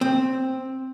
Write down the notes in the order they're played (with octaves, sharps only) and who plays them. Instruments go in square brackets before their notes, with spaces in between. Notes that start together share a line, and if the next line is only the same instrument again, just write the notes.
[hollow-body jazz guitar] C4